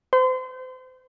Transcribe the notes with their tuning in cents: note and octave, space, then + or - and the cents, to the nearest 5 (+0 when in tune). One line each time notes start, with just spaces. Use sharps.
C5 -35 C6 -35